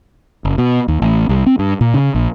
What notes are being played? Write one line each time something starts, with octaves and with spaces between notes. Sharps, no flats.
F#1
B2
D#2
A1
C2
C4
G2
A#2
C#3
A#1